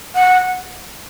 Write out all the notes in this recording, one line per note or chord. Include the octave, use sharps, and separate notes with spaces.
F#5